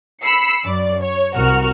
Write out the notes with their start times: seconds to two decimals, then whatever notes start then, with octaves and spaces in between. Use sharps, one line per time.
0.22 B5 E6 C7 C#7
0.65 F#2 D5
1.02 C#5
1.35 C2 F#4 A#4 F6